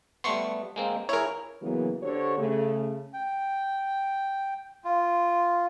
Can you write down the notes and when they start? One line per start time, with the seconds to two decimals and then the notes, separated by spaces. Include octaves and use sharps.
0.24 G3 A3 B3 C6 C#6
0.76 G#3 A#3 C4
1.09 E4 G#4 A#4 C#5
1.61 C#3 E3 F#3 A#3 B3
2.02 D3 G4 C5 C#5
2.37 C#3 A3
3.14 G5
4.84 F4